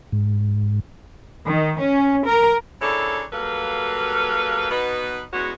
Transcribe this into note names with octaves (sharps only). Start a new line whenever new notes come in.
G#2
D#3
C#4
A#4
C#3 A#3 D4 E4 A4 C#5
F#3 G3 A#3 A4 B4 F5
B2 B3 D#4 B4
E2 G#3 B3 C#4 F#4 C#5